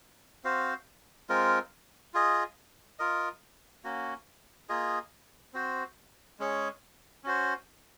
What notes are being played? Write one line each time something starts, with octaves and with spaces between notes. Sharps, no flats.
C4 F#4 C5 F5
G#3 C4 F4 A#4
F4 G#4 D#5
F4 A#4 D#5
A#3 C#4 F#4
A#3 F4 G#4 D#5
C4 F#4 C5
G#3 C#4 G#4 C#5
C#4 F#4 C5